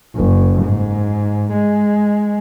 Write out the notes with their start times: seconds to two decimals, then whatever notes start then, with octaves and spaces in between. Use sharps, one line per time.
0.16 F#1
0.63 G#2
1.53 G#3